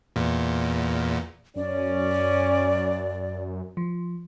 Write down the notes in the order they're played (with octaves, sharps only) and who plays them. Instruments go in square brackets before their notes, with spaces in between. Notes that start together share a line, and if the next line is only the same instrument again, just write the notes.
[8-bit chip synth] E2 A#2
[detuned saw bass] F#2 [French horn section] C#4 [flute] D5
[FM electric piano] F3